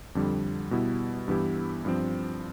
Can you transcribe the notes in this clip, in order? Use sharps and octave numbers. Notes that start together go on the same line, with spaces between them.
F2 D3 G3
B2 G3 B3 E4
G2 E3 B3 E4 G4
G2 F3 C4